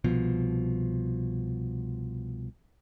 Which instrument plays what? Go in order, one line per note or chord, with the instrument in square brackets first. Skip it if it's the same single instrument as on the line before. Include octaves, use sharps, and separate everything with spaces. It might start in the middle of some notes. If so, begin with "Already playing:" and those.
[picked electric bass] C2 B2 F3